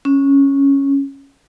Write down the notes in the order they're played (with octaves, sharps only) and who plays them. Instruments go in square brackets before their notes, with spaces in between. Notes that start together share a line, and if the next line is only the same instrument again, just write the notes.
[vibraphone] C#4